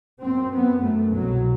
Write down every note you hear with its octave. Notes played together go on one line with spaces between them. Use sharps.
F#2 C4
F#2 B3
F#2 A3
C2 B2 F#3